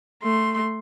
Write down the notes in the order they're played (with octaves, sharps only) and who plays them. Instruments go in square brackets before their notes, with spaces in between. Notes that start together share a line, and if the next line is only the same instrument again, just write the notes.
[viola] A3 C6